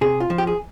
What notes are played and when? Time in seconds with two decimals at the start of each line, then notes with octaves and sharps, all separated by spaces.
0.01 C3 G#4
0.20 F4
0.30 F3
0.38 G4
0.47 G#4